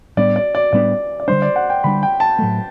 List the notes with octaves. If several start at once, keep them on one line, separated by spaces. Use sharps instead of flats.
A2 G3 B3 D4 D5
D5
D5
A2 G3 B3 D4 D5
D5
D3 G3 D4 C5
D5
F#5
G5
D3 G3 D4 B5
G5
A5
A2 F#3 A3